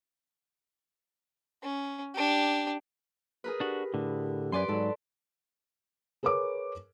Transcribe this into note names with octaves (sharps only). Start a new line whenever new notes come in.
C#4
D4 G4
G#4 A#4 B4
D4 F#4 G4
A2 D3
F#2 B4 D5 G#5 C6
G#2 F#3 A4
G#4 A#4 B4 C#5 D6